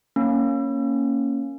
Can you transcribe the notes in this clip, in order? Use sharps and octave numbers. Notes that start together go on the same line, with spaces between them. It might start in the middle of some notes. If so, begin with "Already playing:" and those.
A#3 C#4